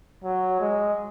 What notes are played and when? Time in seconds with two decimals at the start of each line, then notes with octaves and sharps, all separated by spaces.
0.24 F#3
0.61 G#3